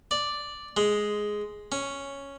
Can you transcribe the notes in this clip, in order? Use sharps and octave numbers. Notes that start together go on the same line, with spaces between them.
D5
G#3
C#4